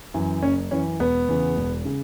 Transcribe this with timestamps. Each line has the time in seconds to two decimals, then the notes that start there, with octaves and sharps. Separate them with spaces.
0.14 F#2 E3
0.42 F#1 C#4
0.71 F#2 E3 C#4
0.99 E1 B3
1.29 E2 C#3
1.56 E1
1.85 C#3